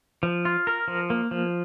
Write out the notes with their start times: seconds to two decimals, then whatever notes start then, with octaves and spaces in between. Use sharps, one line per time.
0.23 F3
0.45 F4
0.67 A#4
0.88 F3
1.10 A#3
1.31 F3